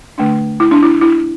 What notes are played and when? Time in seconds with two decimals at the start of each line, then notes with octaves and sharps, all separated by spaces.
0.18 D3 A3 D4
0.60 E4
0.71 D4
0.83 E4
1.01 E4